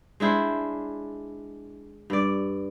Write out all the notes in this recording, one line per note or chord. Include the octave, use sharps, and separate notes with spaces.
G#3 D4 E4 C5
G2 D5